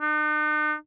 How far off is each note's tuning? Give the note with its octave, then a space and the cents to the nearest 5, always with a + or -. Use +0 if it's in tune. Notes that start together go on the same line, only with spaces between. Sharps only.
D#4 -45